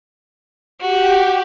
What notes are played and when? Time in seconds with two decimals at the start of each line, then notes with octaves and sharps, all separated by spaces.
0.81 F#4 G4